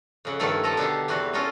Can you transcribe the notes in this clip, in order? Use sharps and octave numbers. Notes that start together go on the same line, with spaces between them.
F2 C#3 F#5
G2 D#3 F3 A3 C#4 A4
F3 A4 D#5 A5 A#5
B2 D3 G4 F5
E2 C3 B3 F#4 B4
C#4 F4 A4 A#4 D#5